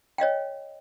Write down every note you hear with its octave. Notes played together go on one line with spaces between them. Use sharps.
C#5 D#5 F5 G5